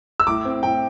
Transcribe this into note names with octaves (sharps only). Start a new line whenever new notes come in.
E6
A2 D6
C4
A2 G5